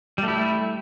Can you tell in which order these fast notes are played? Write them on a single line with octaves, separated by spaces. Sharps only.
G3 A3 E4